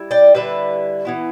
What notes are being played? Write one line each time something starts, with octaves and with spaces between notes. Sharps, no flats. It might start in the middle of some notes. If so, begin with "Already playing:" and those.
Already playing: G3 E4
D5 G5
D3 G3 E4 B4 E5
E3 B3 E4